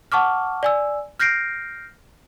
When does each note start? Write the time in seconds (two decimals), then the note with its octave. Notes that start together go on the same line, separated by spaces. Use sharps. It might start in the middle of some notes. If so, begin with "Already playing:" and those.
0.12 F#5 A5 C#6 D6 F6
0.63 D5 G#5 E6
1.20 F6 G6 A#6 C7 D7